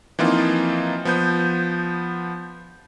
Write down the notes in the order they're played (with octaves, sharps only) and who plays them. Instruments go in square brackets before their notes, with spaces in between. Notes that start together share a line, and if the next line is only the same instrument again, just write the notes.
[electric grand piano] E3 F3 A#3 C4 D#4 F4
F3 B3 G6